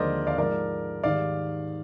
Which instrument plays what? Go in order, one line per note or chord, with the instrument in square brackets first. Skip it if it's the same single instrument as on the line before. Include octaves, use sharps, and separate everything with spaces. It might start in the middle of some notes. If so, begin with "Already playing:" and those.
Already playing: [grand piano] D#2 D3 F3 G#3 A#4 C5 D5 D#5
D5 F5
G#2 F3 G#3 A#4 D5
G#2 D#3 G3 D5 F5